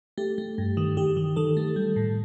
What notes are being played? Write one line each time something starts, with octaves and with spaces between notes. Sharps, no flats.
A3 G4
A3
G2
D#3
D#3 G4
D#3
D#3 A4
A3
G3
A2